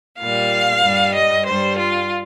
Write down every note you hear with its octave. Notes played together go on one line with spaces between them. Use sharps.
A#2 G3 F5
G2 G3
D#5
G2 G3 C5
F4